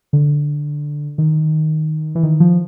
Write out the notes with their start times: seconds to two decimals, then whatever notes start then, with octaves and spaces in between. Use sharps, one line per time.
0.13 D3
1.18 D#3
2.15 E3
2.23 D#3
2.40 F3